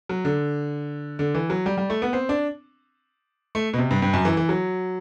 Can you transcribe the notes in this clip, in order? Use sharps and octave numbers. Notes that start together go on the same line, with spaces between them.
F#3
D3
D3
E3
F#3
G3
G3
A3
B3
C4
D4
A3
B2
C3
G2
G2
F#2
E3
E3
F#3